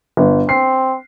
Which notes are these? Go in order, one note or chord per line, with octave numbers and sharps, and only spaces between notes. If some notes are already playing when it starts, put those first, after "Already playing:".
G1
C4 C7